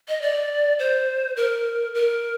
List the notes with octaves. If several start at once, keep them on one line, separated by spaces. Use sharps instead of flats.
D#5
D5
C5
A#4
A#4